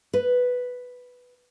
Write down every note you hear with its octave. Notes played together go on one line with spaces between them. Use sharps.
B4